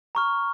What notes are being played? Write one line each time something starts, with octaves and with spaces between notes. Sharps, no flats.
A#5 C#6 F6